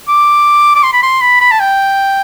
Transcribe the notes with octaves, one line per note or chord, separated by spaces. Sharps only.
D6
D6
C6
B5
C6
B5
B5
A5
G5